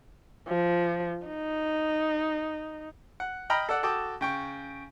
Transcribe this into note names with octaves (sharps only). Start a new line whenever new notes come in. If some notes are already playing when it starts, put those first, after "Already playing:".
F3
D#4
F#5
D#5 G5 A#5 B5 F6
A4 D5 F#5
F#4 A4 G5 A5 D6 D#6
C#3 G5 C#6